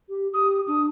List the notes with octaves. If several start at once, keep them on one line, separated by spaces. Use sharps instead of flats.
G4
G4 D#6
D4 D#6